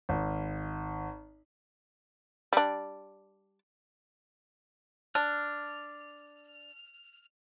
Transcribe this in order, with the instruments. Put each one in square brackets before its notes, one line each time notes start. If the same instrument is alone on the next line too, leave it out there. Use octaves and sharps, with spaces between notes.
[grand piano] G#1
[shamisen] G3 D4
[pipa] D4 [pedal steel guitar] F6